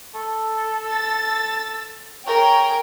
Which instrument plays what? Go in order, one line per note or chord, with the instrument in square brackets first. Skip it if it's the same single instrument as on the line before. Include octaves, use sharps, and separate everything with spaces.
[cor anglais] A4
[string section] E6 A6
[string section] G#4 A#4 G5 [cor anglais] C#5